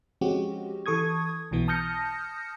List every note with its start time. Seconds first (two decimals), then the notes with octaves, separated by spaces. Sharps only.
0.21 F3 G#3 C4 C#4 F#4 G4
0.86 E3 A4 C#6 D#6 G#6
1.51 B1 B2 E3 B3
1.68 A5 D#6 F6 G6 A#6 C#7